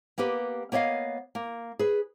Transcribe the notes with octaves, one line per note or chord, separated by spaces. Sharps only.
A#3 B3 G4 B4
A#3 B3 C#5 D#5 F5
A#3
G#4 B4